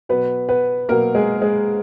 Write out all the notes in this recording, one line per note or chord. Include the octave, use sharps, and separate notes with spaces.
B2 F#3 B3 B4
B3 B4
B2 F#3 A#3 A#4
G#3 G#4
G#3 G#4